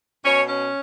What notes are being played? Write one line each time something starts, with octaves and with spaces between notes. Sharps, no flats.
B2 C#4 C#5
C#4